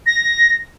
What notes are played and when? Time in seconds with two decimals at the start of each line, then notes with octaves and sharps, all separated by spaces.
0.06 A#6